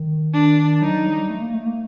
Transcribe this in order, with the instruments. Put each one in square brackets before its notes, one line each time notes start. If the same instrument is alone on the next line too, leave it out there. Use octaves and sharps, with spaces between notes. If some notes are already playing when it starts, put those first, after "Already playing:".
Already playing: [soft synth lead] D#3
[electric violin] D4
[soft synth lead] F#3 [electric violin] D#4
[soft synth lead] G3
A3
A#3
A3
A#3